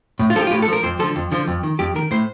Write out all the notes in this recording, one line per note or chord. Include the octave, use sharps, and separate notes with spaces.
A2
F4
F3 A4
G4
F4
A2 G4
A4
F3
A#4
F2 C5
D3 F3 A4
F2
D3 F3
F2
D#3
F2 G4
D#3 A#4
A2 C5